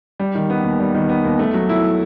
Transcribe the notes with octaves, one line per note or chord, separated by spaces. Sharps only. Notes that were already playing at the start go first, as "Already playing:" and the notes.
G3
D#3
B3
D#2
G3
D#3
B3
D#2
A3
F#3
E4